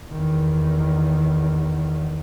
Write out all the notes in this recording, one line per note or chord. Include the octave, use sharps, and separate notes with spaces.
E2 D#3